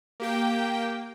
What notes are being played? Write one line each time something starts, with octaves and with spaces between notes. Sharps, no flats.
A#3 G4 G5